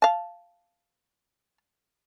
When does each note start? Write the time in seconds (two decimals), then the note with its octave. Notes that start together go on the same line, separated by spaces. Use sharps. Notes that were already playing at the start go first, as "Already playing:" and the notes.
0.02 F5 A5